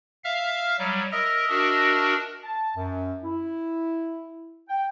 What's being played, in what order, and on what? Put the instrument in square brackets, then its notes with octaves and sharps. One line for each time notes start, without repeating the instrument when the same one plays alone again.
[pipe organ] E5 F5 F6
F#3 G3
[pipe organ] A#4 [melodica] D#5 E5
[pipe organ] D4 F#4 A#4
[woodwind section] A5
F#2
E4
G5